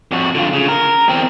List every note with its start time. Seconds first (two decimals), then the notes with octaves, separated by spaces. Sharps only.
0.11 F2 F#4
0.35 D3 F4
0.53 C#3
0.69 A#4
1.09 E2 C4